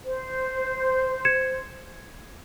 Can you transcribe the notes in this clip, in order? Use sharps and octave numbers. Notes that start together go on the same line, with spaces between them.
C5
G#6 C#7 E7